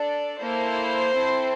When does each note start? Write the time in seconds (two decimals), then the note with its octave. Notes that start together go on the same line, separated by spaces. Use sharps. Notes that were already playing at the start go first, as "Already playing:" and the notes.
Already playing: D4 A4 D5
0.39 A#3 E4 A4 C5
1.12 C4 E4 A4